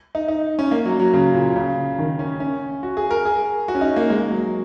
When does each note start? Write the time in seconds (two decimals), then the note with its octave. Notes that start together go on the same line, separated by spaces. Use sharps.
0.15 D#4
0.28 D#4
0.59 C#4
0.71 A#3
0.85 F#3
1.00 F#3
1.14 C#3
1.34 A#2
1.56 C#3
1.99 D#3
2.19 C#4
2.40 C#4
2.83 F#4
2.97 G#4
3.11 A#4
3.25 G#4
3.68 F#4
3.75 C#4
3.81 D#4
3.96 A#3
4.10 G#3
4.31 F#3